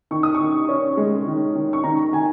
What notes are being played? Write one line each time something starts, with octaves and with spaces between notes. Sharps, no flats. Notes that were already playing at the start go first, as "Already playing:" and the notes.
D#3 C#6
D#6
C#6
D#3
C#4
G#3
D#3
D#3
C#6
D#3 A#5
D#3 G#5